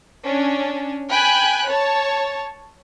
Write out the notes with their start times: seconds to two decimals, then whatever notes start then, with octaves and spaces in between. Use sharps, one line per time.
0.25 C#4 D4
1.10 G5 G#5 B5 F#6
1.68 C#5 A5